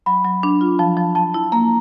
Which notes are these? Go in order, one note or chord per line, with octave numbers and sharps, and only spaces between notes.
F#3 B5
F#3
D4
F4
F3 A5
F3
F3 A5
E4
A#3 A#5